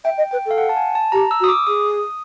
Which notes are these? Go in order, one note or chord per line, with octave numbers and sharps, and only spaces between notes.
E5 G5
D#5
B4 G5
A4
F5
F#5
A5
G#5
A5
G4 A#5
E6
F#4
D#6
D6
G#4 D#6